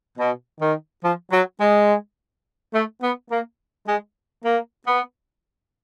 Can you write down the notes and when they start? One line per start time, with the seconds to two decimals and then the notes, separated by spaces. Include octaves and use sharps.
0.18 B2
0.59 D#3
1.03 F3
1.31 F#3
1.59 G#3
2.73 A3
3.02 B3
3.30 A#3
3.87 G#3
4.43 A#3
4.86 B3